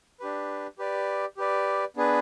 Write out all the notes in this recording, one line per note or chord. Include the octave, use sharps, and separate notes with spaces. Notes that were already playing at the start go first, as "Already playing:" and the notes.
D4 G4 B4
G4 B4 D5
G4 B4 D5
B3 D4 G#4 B4